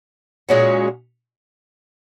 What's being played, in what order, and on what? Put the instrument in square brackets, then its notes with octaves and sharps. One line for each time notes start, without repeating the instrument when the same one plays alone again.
[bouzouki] A#2 G#3 C#4 F#4